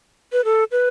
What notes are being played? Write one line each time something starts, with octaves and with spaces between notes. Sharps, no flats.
B4
A4
B4